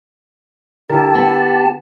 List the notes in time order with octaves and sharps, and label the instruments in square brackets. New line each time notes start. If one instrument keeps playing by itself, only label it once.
[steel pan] D3 A#4 [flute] E4 [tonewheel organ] G4 A5
[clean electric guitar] B3